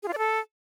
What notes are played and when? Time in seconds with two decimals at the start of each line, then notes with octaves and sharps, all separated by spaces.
0.03 G#4
0.08 F4
0.13 D5
0.18 A4